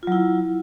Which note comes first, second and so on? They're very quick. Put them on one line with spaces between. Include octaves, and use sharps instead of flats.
F4 F#3 E4